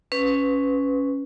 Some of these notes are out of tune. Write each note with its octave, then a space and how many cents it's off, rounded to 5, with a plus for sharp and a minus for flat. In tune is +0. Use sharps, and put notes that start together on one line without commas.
C#4 +0 B4 +10